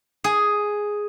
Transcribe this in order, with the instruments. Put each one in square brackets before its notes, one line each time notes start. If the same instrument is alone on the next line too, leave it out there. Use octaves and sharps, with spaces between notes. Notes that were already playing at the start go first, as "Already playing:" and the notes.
[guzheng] G#4